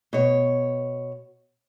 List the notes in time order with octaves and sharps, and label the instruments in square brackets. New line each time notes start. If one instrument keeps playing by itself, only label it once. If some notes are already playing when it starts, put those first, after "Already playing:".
[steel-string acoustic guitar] B2 C#5